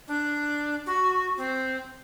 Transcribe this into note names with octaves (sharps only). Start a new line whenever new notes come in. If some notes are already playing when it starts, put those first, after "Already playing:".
D4
F#4
C4